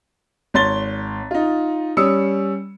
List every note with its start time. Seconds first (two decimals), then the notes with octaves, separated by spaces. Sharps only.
0.54 G#1 C#5 C6 A6 G7
1.31 D#4 F4
1.97 G3 C#4 D#6 E6 C#7